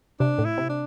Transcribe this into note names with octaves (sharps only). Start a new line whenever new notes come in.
C3 D4
A2
E4
C3
D4